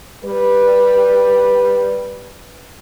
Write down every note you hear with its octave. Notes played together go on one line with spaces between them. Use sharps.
G3 B4